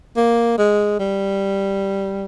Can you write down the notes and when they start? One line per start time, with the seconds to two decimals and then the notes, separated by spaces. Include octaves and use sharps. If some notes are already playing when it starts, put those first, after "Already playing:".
0.17 A#3
0.58 G#3
1.00 G3